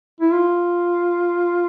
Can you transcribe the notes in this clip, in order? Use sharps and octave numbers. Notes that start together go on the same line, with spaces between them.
E4
F4